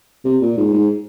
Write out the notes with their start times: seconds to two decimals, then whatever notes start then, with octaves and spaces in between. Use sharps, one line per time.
0.25 C3
0.41 A#2
0.57 G#2
0.73 G#2